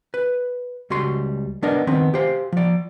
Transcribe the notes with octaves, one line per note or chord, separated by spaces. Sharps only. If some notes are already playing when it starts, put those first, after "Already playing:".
B4
C#2 G3 F#4 C6
B3 D4 A#4 D#5
D#3 B3 C4
G4 C5 F5
F3 D5